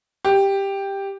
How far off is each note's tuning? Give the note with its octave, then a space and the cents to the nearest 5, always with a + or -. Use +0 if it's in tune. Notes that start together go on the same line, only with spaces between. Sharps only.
G4 +5